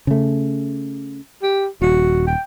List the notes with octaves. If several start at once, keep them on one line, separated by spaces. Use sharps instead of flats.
C#3 A3
G4
D#1 F#4
G5